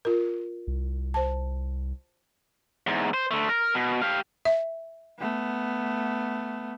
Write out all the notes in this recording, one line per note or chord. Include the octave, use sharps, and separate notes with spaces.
F4 A#4
C2
C5 A5
E2 G#2
C5
D3 A3
A#4
B2
G4 F5
E5
A3 B3